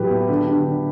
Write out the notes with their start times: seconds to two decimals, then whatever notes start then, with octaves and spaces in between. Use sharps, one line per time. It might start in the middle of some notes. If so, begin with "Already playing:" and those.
Already playing: A2 E3 F#3 G4 B4
0.10 B3
0.29 D3
0.47 D3
0.66 D3